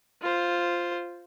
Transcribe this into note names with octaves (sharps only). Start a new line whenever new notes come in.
F4 C5